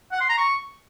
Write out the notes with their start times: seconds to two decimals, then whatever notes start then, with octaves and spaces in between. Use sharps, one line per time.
0.12 F#5
0.21 C6
0.29 A#5
0.38 C#6